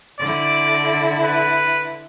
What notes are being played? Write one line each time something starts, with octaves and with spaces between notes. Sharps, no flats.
D3 E4 D5
B4